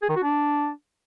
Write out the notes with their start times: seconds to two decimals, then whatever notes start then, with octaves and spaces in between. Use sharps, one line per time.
0.02 G#4
0.09 D#3
0.16 F#4
0.23 D4